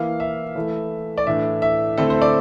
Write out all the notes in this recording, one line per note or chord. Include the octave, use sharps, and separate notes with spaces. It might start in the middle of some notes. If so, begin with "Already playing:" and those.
Already playing: E3 A#3 E4 F5
E5
E3 A3 E4
D5
A2 E3 A3 D4 E5
E5
D3 A3 C4 E4 A4
C5
D5